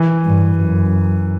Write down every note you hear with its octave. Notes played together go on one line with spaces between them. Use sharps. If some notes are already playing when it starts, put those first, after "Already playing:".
Already playing: E3
G2
F#2